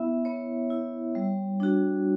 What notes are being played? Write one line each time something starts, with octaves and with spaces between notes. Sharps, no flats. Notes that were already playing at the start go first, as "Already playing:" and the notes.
Already playing: B3 E4 E5
B3 C#5
E4
G3
D4 F#4